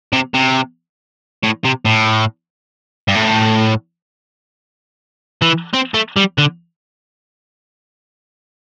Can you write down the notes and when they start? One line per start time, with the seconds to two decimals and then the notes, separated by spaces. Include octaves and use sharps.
0.13 C3
0.34 C3
1.43 A2
1.64 C3
1.85 A2
3.08 G2
3.15 A2
5.42 E3
5.74 C4
5.94 A3
6.17 G3
6.38 D3